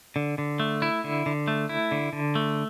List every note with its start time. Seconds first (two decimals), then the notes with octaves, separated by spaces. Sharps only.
0.16 D3
0.38 D3
0.60 A3
0.82 E4
1.04 D3
1.26 D3
1.48 A3
1.69 E4
1.92 D3
2.13 D3
2.35 A3